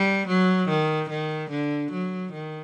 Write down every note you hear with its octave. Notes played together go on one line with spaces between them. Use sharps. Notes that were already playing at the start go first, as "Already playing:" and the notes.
Already playing: G3
F#3
D#3
D#3
D3
F#3
D#3